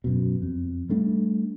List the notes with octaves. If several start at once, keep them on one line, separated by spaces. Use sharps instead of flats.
F#2 B2
F2
G3 A3 D4